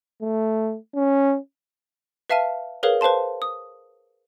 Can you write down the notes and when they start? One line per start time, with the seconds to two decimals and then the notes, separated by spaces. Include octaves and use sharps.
0.22 A3
0.95 C#4
2.30 B4 E5 F5 A5 F6 D#7
2.83 G#4 A#4 B4 C#5 F5
3.01 B4 C5 F5 A5 C6
3.42 D#6